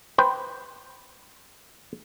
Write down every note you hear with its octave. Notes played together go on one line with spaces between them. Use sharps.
B4 C5 G5